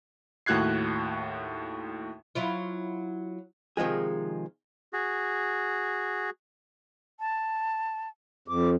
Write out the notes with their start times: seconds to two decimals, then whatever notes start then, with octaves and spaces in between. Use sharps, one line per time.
0.46 D#2 A2 F#4 F#6 G#6 C7
2.35 F#3 E4 F4
3.77 C3 D#3 F3 G#3 G#4
4.93 F#4 G#4
7.20 A5
8.48 F2 D6